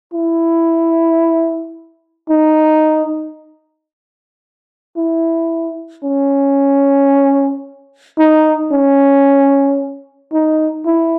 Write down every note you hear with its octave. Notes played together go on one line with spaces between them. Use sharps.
E4
D#4
E4
C#4
D#4
C#4
D#4
E4